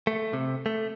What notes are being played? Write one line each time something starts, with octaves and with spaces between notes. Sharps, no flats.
A3
C3
A3